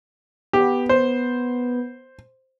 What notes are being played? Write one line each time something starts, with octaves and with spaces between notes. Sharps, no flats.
B3 G4
C5